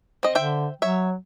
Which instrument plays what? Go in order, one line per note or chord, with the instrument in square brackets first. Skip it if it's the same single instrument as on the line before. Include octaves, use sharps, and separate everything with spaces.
[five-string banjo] C4 D#5
[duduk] D3 [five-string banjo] C5 E5 G5
[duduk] F#3 [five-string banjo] C#5 E5